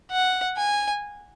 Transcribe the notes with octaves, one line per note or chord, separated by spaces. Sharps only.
F#5
G#5